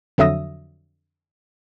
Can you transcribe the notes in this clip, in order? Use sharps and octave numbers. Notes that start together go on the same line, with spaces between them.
F2 D3 F#3 E5 D#6 A#6